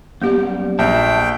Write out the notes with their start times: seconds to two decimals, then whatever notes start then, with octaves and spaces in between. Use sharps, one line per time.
0.22 F#2 G3 A#3 B3 G4
0.79 A#1 E5 G5 A5